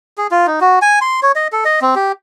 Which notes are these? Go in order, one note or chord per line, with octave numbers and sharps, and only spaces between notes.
G#4
F4
D#4
F#4
G#5
C6
C#5
D#5
A4
D#5
C4
G4